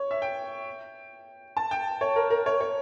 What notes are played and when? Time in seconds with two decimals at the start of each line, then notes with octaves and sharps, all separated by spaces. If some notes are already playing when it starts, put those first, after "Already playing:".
Already playing: C#5
0.11 E5
0.22 G5
1.57 A5
1.71 G5
2.01 C#5
2.16 A#4
2.30 A#4
2.46 C#5
2.61 C#5